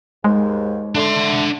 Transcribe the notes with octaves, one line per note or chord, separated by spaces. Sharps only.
D#2 G#2 G#3
D3 A3 D4 C6